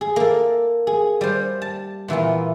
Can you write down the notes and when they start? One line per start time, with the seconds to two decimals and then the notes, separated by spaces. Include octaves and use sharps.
0.01 G#4
0.16 A#3 A4
0.87 G#4
1.21 G3 C5
1.62 A5
2.08 A#2 E3 B3 F4